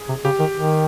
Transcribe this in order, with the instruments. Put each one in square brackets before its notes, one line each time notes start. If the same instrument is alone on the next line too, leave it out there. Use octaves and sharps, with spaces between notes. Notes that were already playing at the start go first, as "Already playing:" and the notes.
Already playing: [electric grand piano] G#4
[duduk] C3
[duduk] C#3 [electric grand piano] G4
[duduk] D#3
D#3